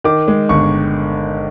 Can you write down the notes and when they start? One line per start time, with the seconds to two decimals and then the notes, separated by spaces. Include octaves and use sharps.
0.04 D#3 D6
0.28 G#3
0.49 G1 C#6